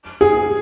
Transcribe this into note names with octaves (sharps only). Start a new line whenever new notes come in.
G#4